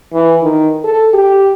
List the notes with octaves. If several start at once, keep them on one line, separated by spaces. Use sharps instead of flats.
E3
D#3
A4
G4